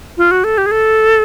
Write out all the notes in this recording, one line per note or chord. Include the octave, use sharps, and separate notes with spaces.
F4
F#4
A4
G4
G#4
A4